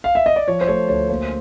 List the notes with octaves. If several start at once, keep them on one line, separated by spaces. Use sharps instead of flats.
F5
E5
D#5
D5
F3 C#5
C5
A3 C#5
D2 C#5
A#3 C5